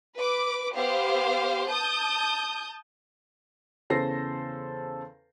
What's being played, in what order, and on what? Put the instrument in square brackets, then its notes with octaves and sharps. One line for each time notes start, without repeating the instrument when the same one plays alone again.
[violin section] B4 D6
B3 G4 C5 F5
A5 D#6 G6
[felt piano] E2 C#3 A4 C5 A#6 C7